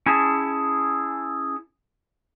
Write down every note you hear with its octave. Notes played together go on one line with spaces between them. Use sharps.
C#4 E4 G#4 A5